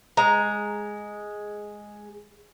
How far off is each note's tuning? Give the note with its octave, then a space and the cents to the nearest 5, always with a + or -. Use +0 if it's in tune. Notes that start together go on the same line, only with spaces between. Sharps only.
G#3 +0 A#5 +0